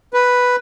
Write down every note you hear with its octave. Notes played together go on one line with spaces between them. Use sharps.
B4